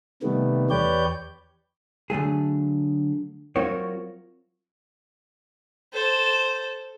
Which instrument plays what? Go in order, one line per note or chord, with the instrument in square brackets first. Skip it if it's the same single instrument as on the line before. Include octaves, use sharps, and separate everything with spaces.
[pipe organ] C3 D#3 G3 A3 B3
E2 G4 B4 C#5 D5 G6
[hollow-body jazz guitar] D3 F#3 A3 G#4
F#3 C4 F4 F#4 A#4 C#5
[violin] A4 C5